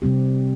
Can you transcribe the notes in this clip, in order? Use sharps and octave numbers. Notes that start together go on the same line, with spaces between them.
C3 G3 C4 G4